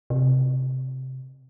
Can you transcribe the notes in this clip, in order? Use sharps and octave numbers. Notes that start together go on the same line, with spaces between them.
C3